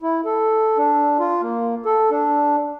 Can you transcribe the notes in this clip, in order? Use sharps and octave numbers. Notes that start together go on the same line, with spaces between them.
E4
A4
D4
F4
A#3
A4
D4